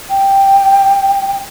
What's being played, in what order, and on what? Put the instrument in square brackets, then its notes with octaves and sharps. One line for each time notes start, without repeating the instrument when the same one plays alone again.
[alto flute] G5